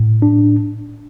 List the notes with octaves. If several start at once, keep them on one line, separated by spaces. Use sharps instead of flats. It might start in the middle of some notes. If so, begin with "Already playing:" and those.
Already playing: A2
D4